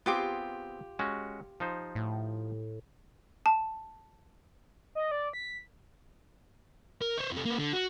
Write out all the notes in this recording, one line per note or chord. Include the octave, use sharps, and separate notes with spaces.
B3 C4 F4 G4 G#4 D6
G#3 C#4 F#4
F3 D#4 C5
A2
A5
D#5
D5
B6
A#4
C5 C#5
F2 A3
A#3 B4
D3
F#4